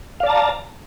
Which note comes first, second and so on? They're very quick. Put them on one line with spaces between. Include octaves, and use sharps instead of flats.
F5 D5 A5 A#5